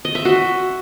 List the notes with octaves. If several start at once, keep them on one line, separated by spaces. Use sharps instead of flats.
D#5
E5
F#4